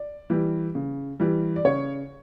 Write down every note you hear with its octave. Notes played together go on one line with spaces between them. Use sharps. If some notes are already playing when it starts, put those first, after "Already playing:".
Already playing: D5
E3 G3
C#3
E3 G3
D5
C#3 C#5